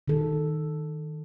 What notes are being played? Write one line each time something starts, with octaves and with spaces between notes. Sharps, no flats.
D#3 A4